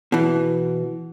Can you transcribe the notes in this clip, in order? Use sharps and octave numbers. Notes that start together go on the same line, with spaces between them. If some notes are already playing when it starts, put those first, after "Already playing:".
B2 E3